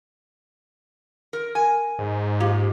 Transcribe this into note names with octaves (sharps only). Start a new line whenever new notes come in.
A#4
A#4 G#5
G#2
A#3 F4 G4